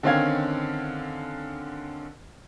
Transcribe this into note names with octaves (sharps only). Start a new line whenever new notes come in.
D3 D#3 C4 C#4 F5 G#6